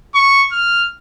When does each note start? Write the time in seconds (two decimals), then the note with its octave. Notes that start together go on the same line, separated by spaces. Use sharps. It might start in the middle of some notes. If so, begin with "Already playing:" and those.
0.15 C#6
0.52 F6